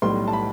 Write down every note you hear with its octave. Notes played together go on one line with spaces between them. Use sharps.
B1 A2 G3 C6
A5
B5